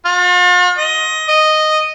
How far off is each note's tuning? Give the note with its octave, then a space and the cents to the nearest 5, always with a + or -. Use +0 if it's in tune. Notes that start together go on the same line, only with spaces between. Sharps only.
F4 +45
D#5 +15
D#5 -5